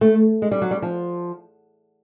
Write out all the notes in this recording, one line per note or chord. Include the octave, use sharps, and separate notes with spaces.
A3
G#3
G3
F#3
G3
F3